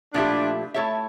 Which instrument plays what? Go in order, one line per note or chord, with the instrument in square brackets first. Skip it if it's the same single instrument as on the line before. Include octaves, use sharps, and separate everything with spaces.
[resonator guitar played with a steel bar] A#2 F3 A3 E4 G4 [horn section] D4
[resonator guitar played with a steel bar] A3 E4 A4 C#5 E5